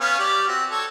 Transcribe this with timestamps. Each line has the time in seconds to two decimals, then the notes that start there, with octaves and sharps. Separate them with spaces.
0.01 B3 C#4 F5
0.19 G4 D5 C#6
0.48 C4 F#4
0.71 A4 C#5